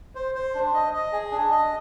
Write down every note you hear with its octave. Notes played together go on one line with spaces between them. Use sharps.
C5
C5
D4
D#5
D#5
G#4
D4
D#5